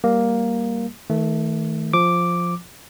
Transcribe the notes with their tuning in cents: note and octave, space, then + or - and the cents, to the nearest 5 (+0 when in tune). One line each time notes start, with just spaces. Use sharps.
G3 +0 A#3 +5
D#3 +40 A3 +0
F3 +0 D6 +0